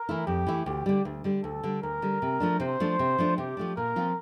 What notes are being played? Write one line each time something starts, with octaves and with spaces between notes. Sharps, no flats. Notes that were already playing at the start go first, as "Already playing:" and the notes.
Already playing: A#4
E3 A3 E4
F2 G4
E3 A3 E4
D2 G4
D3 G3
D2
D3 G3
D2 A4
D3 G3
D2 A#4
D3 G3
C3
F3 A3 D4
C3 C5
F3 A3 D4
C3
F3 A3 D4
C3 G4
F3 A3 D4
A#2 A#4
F3 C4 F4